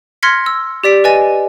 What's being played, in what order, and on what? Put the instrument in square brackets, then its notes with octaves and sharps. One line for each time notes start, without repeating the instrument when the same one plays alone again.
[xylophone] C6 F6 G#6 A#6 B6 C#7
E6
G4 D5 B6 D7
B4 D#5 G#5 A6 D#7